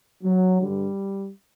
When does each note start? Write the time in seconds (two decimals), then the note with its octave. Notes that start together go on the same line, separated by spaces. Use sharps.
0.24 F#3
0.61 G2 D3 G3